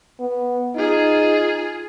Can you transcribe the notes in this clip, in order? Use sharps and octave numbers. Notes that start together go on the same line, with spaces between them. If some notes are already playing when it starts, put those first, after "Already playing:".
B3
D#4 F4 G#4